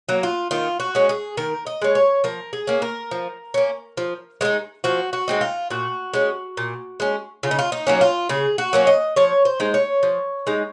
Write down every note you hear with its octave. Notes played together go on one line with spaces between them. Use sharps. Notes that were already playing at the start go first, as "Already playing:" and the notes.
F#3 A#3
F4
D#3 F4
F#4
G#3 C#4
G#4
D#3 A#4
D#5
G#3 C#4
C#5
F3 A#4
G#4
A#3 C#4
A#4
F3
A#3 C#4
F3
G#3 C4 D#4
F3 F#4
F#4
G#3 C4 D#4
F4
A#2 F#4
G#3 C#4
A#2
G#3 C#4
C#3 F4
D#4
F4
D#4
F#3 A#3 C#4
F4
C#3 G#4
F#4
F#3 A#3 C#4
D#5
F3 C#5
C5
G#3 D#4
C#5
F3
G#3 D#4